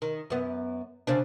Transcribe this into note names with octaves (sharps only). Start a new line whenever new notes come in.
D#3
F#2 B3
C#3 C4 D4